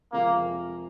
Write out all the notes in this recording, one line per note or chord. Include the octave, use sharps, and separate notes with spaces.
F2 C3 F3 G#3 A#3 C4